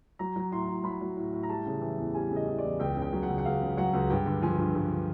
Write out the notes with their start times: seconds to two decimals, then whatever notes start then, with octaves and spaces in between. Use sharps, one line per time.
0.19 F#3 A#5
0.36 F#3
0.51 A2 C6
0.68 A2
0.84 F#3 B5
1.01 F#3
1.17 A2
1.33 A2
1.43 A#5
1.49 G3 A5
1.66 C#3
1.81 E3
1.98 E2
2.15 G3 G#5
2.31 C#3
2.36 D#5
2.48 E3
2.59 D5
2.64 E2
2.79 C#2 G5
2.97 C#3 G5
3.13 F#3
3.23 F#5
3.29 C#2
3.38 F#5
3.45 C#2 F5
3.62 C#3
3.77 F#3 F#5
3.93 C#2
4.10 G2 G5
4.26 D3
4.42 F3 G#5
4.58 G2
4.75 G2
4.92 D3